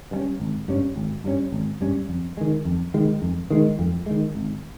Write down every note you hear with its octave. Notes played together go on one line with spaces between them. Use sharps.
G2 G3 C#4
G#1
G2 G3 C#4
G#1
G2 G3 C#4
G#1
G2 G3 C#4
F2
D#3 G#3
F2
D#3 G#3
F2
D#3 G#3
F2
D#3 G#3
G#1